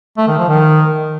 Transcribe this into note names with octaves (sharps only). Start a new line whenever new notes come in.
A3
D#3
F3
D#3